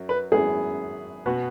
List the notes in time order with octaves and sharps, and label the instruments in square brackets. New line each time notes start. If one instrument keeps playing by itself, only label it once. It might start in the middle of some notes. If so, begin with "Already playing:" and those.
Already playing: [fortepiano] F#2 F#3
[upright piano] B4
[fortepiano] G#1 F#2 F#3 B3 E4 [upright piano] G#4
[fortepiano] B2 B3 F#4